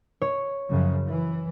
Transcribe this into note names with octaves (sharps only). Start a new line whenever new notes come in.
C#5
F#2 C#3 F3
E3